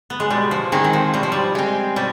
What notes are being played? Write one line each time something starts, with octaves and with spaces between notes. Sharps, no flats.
B3
G#3
B2 G3
F3
D#3 G#3 C4
D#3
F3
B2 G3
F3
G3
G#3 C4
B2 G3